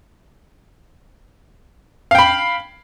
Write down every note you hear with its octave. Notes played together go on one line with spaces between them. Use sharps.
F5 G5 B5